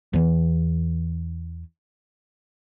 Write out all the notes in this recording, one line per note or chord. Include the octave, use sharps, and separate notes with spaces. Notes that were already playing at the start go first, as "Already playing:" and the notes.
E2 E3